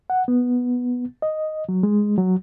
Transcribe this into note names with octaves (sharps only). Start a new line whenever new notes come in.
F#5
B3
D#5
F#3
G#3
F#3